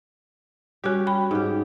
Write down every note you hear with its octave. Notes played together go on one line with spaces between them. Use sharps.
G3 C#4 F#4 G4
G5 B5
G#2 G4